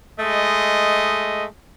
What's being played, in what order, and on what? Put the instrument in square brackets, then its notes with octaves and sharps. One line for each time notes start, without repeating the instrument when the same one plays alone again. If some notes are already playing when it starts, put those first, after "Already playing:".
[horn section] G#3 A3 D#5